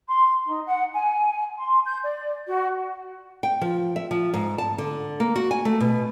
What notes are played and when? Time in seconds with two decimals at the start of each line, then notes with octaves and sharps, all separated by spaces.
0.07 C6
0.45 D#4
0.66 F#5
0.92 G#5
1.56 C6
1.85 G6
2.02 D5
2.45 F#4
3.43 G5
3.61 F3
3.96 E5
4.11 F3
4.34 G#2
4.58 A5
4.78 D3
5.20 A#3
5.36 F#4
5.51 G#5
5.65 A3
5.80 B2